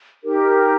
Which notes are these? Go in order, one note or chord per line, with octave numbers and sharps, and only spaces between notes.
D#4 G4 A#4